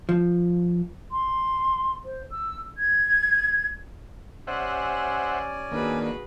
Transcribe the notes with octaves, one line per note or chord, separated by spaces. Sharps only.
F3
C6
C5
E6
G#6
C#4 G4 C5 D5 E5 F#5 G#5
D#3 A#3 D4 F#4 G#4 B4